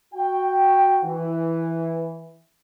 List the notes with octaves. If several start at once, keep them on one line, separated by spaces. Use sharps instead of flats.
F#4 G5
E3